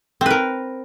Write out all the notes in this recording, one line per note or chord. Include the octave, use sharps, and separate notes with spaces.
C4 A#4 B4